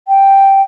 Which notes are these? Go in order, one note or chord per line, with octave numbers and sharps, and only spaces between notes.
G5